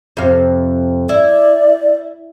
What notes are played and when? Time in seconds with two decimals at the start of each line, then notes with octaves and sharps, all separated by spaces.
0.17 F2 C3 F5
1.09 E4 D5